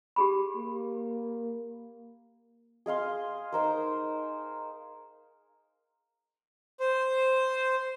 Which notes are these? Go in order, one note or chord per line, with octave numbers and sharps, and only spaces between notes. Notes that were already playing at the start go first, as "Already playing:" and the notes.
G4 G#4 B5
A#3
G#4 D#5 F5 C6
D#4 A#4 C5
C5